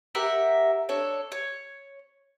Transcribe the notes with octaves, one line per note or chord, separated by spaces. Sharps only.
G4 A#4 E5 F#5
D4 A4 C#5
C#5